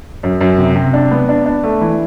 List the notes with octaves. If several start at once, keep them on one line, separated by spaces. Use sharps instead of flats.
F#2
F#2
C3
C3
D4
B3
D4
D4
A3
E3